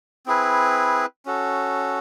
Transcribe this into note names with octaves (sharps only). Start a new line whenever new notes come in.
C4 E4 G#4 B4
C#4 F#4 A4